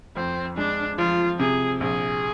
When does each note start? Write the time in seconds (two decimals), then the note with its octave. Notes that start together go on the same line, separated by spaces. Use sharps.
0.16 F2 C4
0.57 G#3 D4
0.98 F3 F4
1.39 C3 G#4
1.80 A#1 G#4